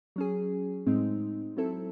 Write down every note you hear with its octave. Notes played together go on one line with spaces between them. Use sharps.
F#3 C#4 G#4
A2 G#3 C4 D#4
F#3 C4 E4 A4